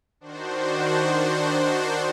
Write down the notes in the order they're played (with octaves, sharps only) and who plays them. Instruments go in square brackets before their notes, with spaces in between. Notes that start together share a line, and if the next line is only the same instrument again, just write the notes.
[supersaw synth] D#3 D4 F#4 C5